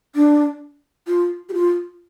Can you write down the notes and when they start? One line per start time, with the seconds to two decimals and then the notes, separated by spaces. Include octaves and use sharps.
0.15 D4
1.07 F4
1.49 G4
1.54 F4